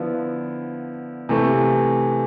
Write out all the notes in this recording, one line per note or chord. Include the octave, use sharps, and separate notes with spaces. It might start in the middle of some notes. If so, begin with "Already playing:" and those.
Already playing: D3 F3 B3 E4
C3 E3 A3